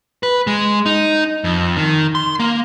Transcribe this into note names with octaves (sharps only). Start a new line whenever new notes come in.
B4
G#3
D#4
F2
D#3
C6
A#3